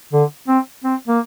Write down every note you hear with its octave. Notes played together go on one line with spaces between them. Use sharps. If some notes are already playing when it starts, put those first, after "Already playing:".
D3
C4
C4
A#3